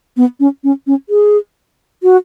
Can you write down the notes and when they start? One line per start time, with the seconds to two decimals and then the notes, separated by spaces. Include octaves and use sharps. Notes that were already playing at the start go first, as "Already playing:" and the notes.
0.17 B3
0.40 C#4
0.64 C#4
0.87 C#4
1.09 G#4
2.03 F#4